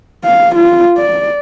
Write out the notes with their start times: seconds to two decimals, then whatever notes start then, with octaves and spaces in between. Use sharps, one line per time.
0.24 F5
0.55 F4
0.97 D5